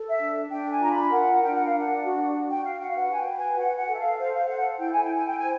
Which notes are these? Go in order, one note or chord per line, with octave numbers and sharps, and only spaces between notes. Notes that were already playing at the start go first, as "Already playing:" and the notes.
Already playing: A4
E5
D4
D4 G5
G#5
F4 A#5
B5
A#4 F#5
D4 G5
F#5
F5
D4 F#5
F#4
F#4
G5
F#4 F5
F#5
F5
B4 F#5
G#5
G5
B4
G#5
F#4 F#5
F#5
A4
E5
F5
C5 F5
F5
A4 F#5
E4 G5
G#5
G5
E4 G#5
G5
C5 G#5